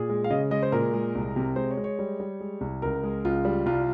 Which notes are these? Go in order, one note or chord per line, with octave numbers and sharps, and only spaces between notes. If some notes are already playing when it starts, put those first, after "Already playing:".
Already playing: A#2 G#4
G#3
F5
C#3 D#5
G#3 D#5
C5
A#2 A#4
G#3
C2
C3
G#3 C5
C#5
G#3
C#5
G3
G3
G#3
C2
C#2 A#4
G#3
C#2 F4
G3
C2 F4